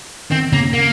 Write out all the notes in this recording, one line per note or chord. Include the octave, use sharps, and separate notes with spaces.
D#3 C4
C#3 A#3
C3
C#3 A#3